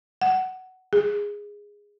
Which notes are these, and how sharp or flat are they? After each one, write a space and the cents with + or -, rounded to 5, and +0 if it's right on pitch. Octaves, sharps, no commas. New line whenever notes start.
F#5 +10
G#4 -10